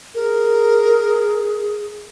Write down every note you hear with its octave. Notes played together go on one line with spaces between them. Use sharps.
G#4 A#4